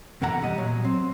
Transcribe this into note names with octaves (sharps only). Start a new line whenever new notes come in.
F2 B2 D3 E3 F#5 A#5
G3 D#5
A#2 F#3
C4